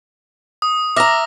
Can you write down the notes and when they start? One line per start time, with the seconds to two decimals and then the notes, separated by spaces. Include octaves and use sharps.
0.62 D#6
0.96 E5 F5 A#5 D6 F6 A#6